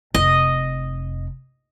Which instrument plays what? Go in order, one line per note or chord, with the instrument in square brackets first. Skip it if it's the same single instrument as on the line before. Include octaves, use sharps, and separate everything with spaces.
[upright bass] F1 [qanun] D#5